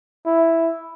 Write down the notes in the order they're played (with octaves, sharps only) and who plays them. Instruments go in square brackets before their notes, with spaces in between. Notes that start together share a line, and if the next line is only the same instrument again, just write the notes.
[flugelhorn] E4